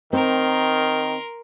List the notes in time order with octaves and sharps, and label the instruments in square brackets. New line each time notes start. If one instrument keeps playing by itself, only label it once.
[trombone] D#3 [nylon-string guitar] C4 [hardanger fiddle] A#4 C6